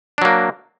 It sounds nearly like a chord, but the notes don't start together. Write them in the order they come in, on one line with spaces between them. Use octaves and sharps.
D4 F#3 A#3